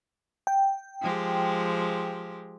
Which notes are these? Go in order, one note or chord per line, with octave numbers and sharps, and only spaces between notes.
G5
F3 G#3 G4